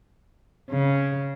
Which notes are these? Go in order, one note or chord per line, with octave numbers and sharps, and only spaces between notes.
C#3